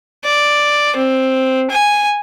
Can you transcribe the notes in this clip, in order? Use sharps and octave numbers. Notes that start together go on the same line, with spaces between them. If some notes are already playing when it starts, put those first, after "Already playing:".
D5
C4
G#5